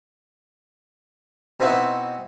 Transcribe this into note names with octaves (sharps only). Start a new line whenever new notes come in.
B2 C4 D#4 E4 F#4